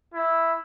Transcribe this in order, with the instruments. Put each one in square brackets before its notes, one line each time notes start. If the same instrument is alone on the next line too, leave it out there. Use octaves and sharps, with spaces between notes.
[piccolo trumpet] E4